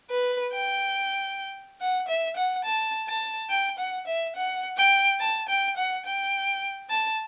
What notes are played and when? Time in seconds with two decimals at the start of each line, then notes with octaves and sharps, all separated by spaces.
0.10 B4
0.53 G5
1.81 F#5
2.08 E5
2.37 F#5
2.65 A5
3.07 A5
3.50 G5
3.78 F#5
4.07 E5
4.36 F#5
4.77 G5
5.20 A5
5.49 G5
5.77 F#5
6.05 G5
6.90 A5